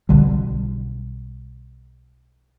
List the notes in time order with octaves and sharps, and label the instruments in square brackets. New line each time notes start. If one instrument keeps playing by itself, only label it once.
[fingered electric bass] B1 D3 G3